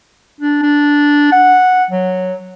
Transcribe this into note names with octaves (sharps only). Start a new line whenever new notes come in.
D4
D4
F#5
F#3